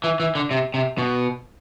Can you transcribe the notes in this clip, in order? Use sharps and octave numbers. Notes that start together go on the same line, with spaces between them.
E3
E3
D3
C3
C3
B2